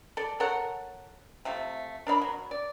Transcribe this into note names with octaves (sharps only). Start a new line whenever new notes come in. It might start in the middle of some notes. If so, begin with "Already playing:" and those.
A4 D5
A4 A#4 C#5 F#5
C3 F3 A3
D4 A#4 D5 B5
F#3
D5